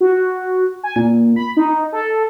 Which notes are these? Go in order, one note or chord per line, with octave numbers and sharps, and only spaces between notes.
F#4
G#5
A#2
B5
D#4
A4